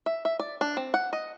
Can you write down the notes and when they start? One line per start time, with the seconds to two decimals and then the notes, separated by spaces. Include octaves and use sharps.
0.06 E5
0.25 E5
0.39 D5
0.61 D4
0.77 C4
0.94 F#5
1.13 D#5